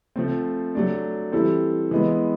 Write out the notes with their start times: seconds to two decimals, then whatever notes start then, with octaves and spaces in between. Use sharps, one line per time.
0.16 F3 A3 C4
0.75 F#3 A3 D4
1.32 E3 G3 C4 E4 A4
1.91 E3 G#3 B3